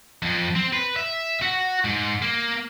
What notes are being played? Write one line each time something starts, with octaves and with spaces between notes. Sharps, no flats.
F2
C4
B4
E5
F#4
G#2
A#3